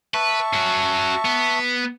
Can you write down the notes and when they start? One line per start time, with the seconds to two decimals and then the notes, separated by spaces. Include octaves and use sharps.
0.14 B4 E5 A5 C#6
0.53 C#4 F#4
1.25 B3